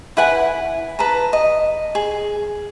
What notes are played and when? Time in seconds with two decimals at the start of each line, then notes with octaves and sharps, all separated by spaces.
0.17 E4 B4 F#5 G#5
0.99 B4 A5 A#5
1.33 D#5
1.95 G#4